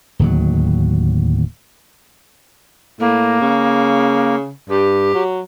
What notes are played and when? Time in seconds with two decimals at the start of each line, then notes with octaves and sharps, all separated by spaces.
0.19 D1 D#2 F#3
3.00 A2 A#3
3.41 C#3
4.69 G2 G4
5.14 F#3